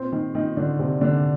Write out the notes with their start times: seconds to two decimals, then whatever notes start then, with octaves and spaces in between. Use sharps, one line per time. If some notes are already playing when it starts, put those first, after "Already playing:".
Already playing: A#2 C4 C5
0.12 D#3 D#4
0.35 D#3 D#4
0.57 D3 D4
0.79 C3 C4
1.01 D3 D4